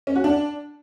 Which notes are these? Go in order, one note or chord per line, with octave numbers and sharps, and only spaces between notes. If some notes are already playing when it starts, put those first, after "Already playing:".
C#4
F#4
D4